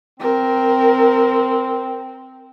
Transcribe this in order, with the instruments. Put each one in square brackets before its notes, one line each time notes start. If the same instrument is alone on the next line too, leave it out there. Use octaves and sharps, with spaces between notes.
[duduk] C4 [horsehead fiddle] A#4